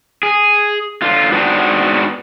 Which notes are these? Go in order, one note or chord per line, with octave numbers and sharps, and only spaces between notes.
G#4
D3 F4
G#2 B3 C4 D4 F#4